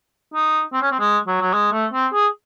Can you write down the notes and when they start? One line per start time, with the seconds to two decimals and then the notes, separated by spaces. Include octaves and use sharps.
0.34 D#4
0.73 C4
0.82 C#4
0.91 C4
0.99 G#3
1.27 F#3
1.41 F#3
1.53 G#3
1.72 A3
1.93 C4
2.13 G#4